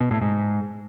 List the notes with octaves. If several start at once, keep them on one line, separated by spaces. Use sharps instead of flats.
B2
A2
G#2